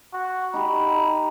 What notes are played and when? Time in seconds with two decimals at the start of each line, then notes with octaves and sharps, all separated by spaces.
0.13 F#4
0.54 D#4 G4 B5